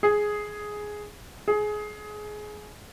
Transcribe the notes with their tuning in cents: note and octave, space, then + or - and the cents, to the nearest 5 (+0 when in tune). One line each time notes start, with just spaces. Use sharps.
G#4 +5
G#4 +20